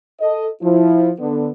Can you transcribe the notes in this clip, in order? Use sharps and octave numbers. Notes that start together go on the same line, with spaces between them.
A4 D#5
F3 E4
D3 B3